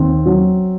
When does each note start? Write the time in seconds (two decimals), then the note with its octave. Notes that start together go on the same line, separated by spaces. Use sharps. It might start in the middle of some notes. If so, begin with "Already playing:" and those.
Already playing: D#2 C4
0.26 F#3